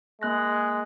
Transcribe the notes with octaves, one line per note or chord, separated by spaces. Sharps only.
G#3 A#3 F#6 A#6